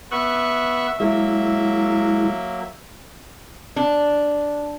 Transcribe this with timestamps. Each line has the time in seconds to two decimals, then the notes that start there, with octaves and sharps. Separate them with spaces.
0.11 B3 E5 C#6 F#6
1.00 F#3 G#3 A#3 E4 E5
3.76 D4